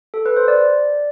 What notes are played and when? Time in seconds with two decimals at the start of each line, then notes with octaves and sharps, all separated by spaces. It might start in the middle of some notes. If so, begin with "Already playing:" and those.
0.14 A4
0.26 B4
0.37 C5
0.48 D5